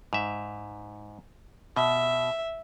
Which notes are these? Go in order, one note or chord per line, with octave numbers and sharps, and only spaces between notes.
G#2 E5
B2 E5